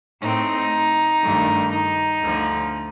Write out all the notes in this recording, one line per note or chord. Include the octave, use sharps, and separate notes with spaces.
A2 A3 C4 D#4
G2 D#3 A3 D4
D#4
D2 D3 F3